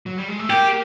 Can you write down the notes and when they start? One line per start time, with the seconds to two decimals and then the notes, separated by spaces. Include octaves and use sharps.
0.06 F#3
0.17 G3
0.28 G#3
0.39 A3
0.50 A#3 G4